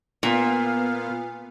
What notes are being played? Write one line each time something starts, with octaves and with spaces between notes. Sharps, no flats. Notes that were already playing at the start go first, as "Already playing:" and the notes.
A#2 B3 F5